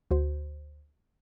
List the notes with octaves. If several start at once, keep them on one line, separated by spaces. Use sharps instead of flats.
D2 F#4 C5